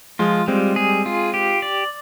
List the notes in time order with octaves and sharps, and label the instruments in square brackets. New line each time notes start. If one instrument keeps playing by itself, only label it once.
[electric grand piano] F3 G#3 [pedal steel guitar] F4
[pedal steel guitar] G3 [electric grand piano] G#3 C4
[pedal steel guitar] G#4
F4
G4
D5